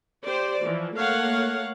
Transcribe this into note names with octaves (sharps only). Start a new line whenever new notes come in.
G4 C5 D5
E3 F3
A3 A#3 C#5 F5 F#5